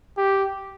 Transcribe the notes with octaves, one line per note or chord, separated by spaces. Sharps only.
G4